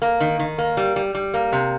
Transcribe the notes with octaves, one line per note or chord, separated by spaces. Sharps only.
A#3
D#3
D#3
A#3
G3
G3
G3
A#3
C3